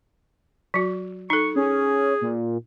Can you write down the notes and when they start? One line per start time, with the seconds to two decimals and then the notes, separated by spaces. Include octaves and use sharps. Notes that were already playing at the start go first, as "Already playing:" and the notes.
0.74 F#3 F#4
1.30 D#4 A4 C#6
1.56 C#4 G#4
2.21 A#2